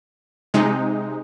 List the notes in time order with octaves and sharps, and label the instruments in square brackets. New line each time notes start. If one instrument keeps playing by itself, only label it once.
[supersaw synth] C3 G#3 D#4